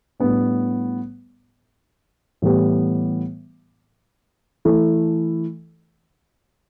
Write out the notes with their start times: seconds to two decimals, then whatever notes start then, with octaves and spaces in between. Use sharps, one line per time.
0.20 A2 G3 B3 D4
2.42 A2 E3 G3 B3 G4
4.65 E3 A3 E4 A4